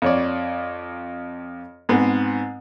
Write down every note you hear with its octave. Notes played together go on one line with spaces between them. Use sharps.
F2 C#5 D5
G#2 B3 C4